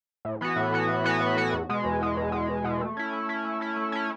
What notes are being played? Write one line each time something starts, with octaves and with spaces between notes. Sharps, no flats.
A2
E3 B3 F#4
A2
E3 B3 F#4
A2
E3 B3 F#4
A2
E3 B3 F#4
E2
B2 G#3
E2
B2 G#3
E2
B2 G#3
E2
B2 G#3
A3
C#4 E4
A3
C#4 E4
A3
C#4 E4
A3
C#4 E4